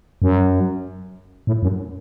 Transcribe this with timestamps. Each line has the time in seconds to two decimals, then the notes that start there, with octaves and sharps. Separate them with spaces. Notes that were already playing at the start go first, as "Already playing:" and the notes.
0.22 F#2
1.47 A2
1.63 F#2